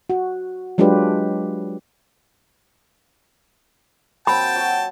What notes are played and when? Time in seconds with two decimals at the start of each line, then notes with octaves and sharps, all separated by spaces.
0.10 F#4
0.78 F#3 G#3 D4 F4 G4 B4
4.27 F#3 A#3 C4 G5 A5 B5
4.56 F#3 C#5